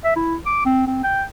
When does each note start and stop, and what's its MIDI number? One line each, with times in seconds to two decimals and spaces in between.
0.04 0.14 76
0.16 0.35 64
0.46 0.65 86
0.66 0.86 60
0.88 1.00 60
1.03 1.23 79